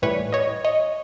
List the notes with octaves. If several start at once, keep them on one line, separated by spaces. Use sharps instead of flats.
A2 E3 G3 B4 C#5
C#5 D#5
C#5 D#5